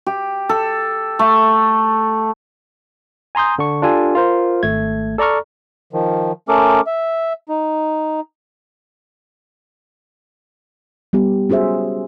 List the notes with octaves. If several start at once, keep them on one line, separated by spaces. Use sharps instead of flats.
G4
A4
A3
G#5 A#5 C6 D#6 G6
D3 D4 C#6
D4 F4 G4 A4 G#5
F4 A#4 C5
G#1 A3 G#6
A4 D5 A#5 C#6 F6
D#3 F3
A3 C#4 A4 A#4 D6
E5
D#4
G3 B3 G4
C#4 F#4 G#4 C5 E5